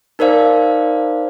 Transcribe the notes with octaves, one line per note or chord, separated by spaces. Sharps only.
D#4 A#4 C5 D5 F5